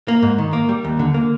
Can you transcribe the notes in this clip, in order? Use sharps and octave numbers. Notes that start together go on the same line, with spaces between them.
A#3
G#2
D#3
A#3
G3
D#2
D3
A#3